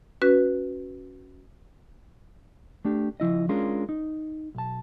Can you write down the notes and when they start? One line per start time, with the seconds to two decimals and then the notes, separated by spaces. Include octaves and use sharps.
0.22 C#4 F#4 B4
2.85 A3 D4 G4
3.20 C#2 F3 E4 D#5
3.49 G#3 C#4 D4 F4 G#4 A#4
3.89 D#4
4.55 B1 A5